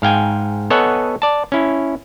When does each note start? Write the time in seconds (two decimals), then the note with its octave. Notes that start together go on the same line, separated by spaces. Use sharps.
0.02 G#2 F5 G5 G#5
0.70 B3 A4 C#5 D#5 F#5 G#5
1.22 D5 A5
1.52 C#4 E4